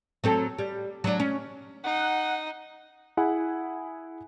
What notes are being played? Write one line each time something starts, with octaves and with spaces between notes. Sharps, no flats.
F#3 C4 A4
G3
F#3 D4
C#4
D#4 F#5
E4 G#4 F#5 G#5 B5